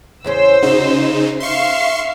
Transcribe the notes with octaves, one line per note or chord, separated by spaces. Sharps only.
E2 C#3 C#4 C5 E6
C#3 D#4 F#4
E5 F5 C6 C#6 C7